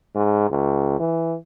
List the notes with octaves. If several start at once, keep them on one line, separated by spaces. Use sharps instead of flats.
G#2
C#2
E3